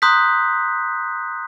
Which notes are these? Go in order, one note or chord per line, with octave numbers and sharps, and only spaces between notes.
A#5 C6 D#6 F#6 G6 B6